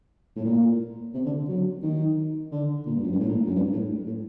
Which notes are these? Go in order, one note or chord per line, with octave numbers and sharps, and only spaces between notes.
A2
A#2
C3
D3
F#3
D#3
D3
A#2
G2
F#2
G2
A2
A#2
F#2
G2
A2
A2